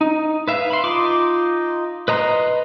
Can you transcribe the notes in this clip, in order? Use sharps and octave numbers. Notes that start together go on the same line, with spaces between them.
D#4
B4 E5 F5
B5 C6
D#4 F4 C6 D6
B4 D#5 A#5 C6